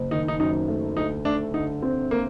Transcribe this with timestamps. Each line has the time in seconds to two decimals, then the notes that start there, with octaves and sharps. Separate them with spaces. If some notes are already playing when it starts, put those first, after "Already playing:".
Already playing: F#1
0.11 D#3 D#4
0.28 D#4
0.40 F#2 D#4
0.68 A3
0.97 D2 D#4
1.25 A3 D4
1.54 D3 D#4
1.82 C4
2.11 A#3